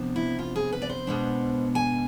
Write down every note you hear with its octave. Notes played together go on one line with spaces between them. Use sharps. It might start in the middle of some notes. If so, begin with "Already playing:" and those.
Already playing: C3 F3 B3 D4
E4
F4
G#4
B4
D5
C5
B2 G#3 B3 D4
G#5